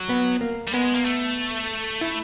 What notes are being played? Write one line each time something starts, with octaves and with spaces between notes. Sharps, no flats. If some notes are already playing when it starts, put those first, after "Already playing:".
Already playing: F#3
B3
A#3
G3
G#3 B3
A#3
A3
E4